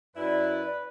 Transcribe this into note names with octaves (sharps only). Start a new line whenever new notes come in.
F#2 E4 B4 D5